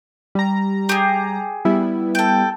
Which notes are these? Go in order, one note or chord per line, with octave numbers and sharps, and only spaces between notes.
G3 A#5
G4 G#4
G3 B3 E4
A4 G5